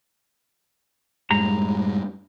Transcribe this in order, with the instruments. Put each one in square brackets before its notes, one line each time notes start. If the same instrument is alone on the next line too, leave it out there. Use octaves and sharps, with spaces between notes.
[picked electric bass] F#2 A2 G#3 [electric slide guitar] G3 A#5